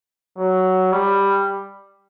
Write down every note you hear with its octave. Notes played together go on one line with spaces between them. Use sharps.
F#3
G3